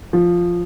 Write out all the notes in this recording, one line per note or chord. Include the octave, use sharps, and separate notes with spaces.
F3